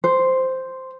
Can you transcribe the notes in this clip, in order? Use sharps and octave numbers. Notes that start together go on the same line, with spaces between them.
C5